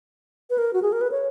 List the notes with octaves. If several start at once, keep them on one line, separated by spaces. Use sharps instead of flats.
B4
A#4
F#4
G#4
A#4
B4
C#5